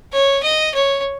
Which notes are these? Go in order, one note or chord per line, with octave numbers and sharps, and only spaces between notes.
C#5
D#5
C#5